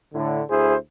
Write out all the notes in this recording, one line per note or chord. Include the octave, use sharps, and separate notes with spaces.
A2 D3
D2 E4 G#4 C5